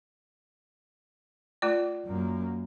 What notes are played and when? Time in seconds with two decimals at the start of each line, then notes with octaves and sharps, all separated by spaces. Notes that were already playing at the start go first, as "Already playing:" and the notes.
1.62 A3 F4 D5
2.06 F#2 A#3